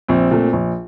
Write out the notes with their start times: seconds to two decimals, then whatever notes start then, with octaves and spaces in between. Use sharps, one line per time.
0.08 A#1 C4
0.31 A#2 A3
0.53 A#1